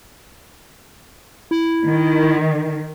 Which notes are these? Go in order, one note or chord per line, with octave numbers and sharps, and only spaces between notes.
E4
D#3